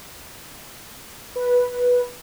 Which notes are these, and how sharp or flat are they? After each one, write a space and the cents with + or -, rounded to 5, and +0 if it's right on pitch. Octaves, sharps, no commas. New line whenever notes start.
B4 -10